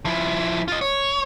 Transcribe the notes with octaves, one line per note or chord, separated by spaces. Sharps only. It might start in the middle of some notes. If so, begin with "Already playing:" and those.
F3 E4
F4 D#5
C#5